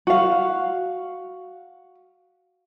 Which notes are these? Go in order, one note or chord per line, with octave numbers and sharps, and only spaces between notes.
F#4 F5